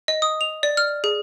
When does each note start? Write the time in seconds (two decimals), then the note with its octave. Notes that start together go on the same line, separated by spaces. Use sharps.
0.08 D#5
0.22 D#6
0.41 F7
0.63 D5
0.77 F6
1.04 G#4